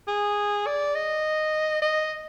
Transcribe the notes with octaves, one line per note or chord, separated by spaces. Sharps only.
G#4
D5
D#5
D#5